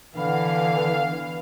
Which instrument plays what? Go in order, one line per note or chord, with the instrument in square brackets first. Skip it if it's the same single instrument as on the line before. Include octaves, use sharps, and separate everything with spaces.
[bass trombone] D3 [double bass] E3 [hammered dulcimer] B3 [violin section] F5